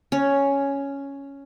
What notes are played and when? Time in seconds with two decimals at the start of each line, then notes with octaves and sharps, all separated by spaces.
0.12 C#4